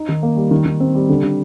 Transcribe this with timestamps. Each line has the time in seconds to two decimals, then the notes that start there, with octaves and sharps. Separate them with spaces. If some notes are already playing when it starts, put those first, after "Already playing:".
Already playing: D#4
0.09 D#3
0.23 A#3
0.36 G3
0.51 D#3
0.66 D#3
0.80 C4
0.95 G3
1.09 D3
1.23 D3